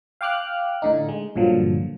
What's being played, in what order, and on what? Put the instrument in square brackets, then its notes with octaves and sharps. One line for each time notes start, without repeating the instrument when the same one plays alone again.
[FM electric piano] F5 G5 D6 F6 F#6
A2 D3 D#4
G#3
G2 A#2 D3 F3 F#3